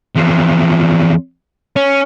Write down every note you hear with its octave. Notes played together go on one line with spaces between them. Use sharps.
E2 F3
C#4